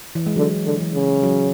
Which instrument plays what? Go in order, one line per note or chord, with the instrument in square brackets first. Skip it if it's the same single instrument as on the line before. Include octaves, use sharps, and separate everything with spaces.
[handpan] E3
G#3
[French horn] D3 [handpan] F#3
[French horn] D3
[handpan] E3
[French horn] C#3
[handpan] F#3